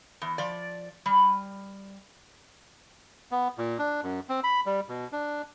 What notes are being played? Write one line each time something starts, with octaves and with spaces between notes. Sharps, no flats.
E2
F3 D5
G3
B3
A#2
D4
F#2
C4
B5
G3
B2
D4